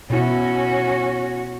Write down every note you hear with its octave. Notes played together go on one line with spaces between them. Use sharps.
B2 C#4 E4 F#4